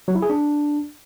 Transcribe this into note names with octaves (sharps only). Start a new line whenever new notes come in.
F#3
E4
G#4
D4